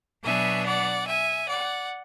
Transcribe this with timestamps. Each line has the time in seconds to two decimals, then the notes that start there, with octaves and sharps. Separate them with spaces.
0.24 B2 F#3 B3 D4 E5 G#5
0.65 D5 F#5
1.07 E5 G#5
1.48 D5 F#5